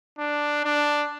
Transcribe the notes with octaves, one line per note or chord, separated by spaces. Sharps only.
D4
D4